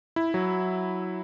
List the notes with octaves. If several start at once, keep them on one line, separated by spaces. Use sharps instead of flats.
E4
F#3